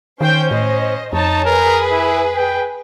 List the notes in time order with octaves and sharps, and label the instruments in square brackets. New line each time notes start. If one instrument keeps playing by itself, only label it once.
[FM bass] D#3 [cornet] C#4 [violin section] C5 G5 G6
[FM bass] A2 [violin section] C5 D#5
[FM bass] F2 [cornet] D#4 [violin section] C#5 A5
[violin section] G#4 B4 [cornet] A#4
[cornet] E4
G5